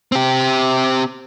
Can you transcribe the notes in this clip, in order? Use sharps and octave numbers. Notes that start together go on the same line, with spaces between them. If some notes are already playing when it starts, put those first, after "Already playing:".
C4 G4